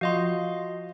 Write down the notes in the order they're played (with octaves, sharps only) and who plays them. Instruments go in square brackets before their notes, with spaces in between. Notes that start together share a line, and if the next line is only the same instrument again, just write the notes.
[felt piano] F3 [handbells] F#4 D#5 C6